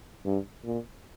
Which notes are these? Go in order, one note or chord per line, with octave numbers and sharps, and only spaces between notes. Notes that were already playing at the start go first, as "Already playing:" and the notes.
G2
A#2